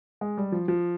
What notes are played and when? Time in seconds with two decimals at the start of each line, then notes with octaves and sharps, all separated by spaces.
0.21 G#3
0.37 G3
0.52 F3
0.68 F3